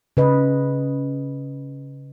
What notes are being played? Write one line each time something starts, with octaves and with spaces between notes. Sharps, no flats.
C#3 B4 D#5